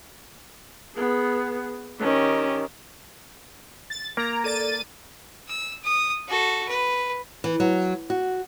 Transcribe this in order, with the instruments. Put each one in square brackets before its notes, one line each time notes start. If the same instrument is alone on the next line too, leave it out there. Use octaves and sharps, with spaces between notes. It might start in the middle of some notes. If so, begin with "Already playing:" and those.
[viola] B3 G#4
[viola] D#3 [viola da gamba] C#4 G4
[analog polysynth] A6
[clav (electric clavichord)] A#3 [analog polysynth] A#5 [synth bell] G#6 D7
[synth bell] A4 D5 [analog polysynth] A6 D#7
[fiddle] E6
D#6
F#4 A4
B4
[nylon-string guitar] E3
F#3
F#4